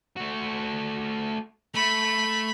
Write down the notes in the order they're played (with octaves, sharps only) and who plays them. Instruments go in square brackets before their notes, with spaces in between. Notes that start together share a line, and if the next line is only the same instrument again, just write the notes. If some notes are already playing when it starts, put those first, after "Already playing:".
[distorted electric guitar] A3 F#4
[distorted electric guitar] A3 [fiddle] B5